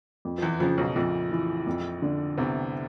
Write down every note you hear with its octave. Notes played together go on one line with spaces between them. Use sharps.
F2
F3
E2 E3
F2 C#3 F3
B1 B2
A#1 F2 A#2
E3
F2
D3
C2 C3 B3